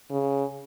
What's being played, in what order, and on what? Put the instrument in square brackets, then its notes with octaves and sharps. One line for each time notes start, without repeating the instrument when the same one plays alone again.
[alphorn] C#3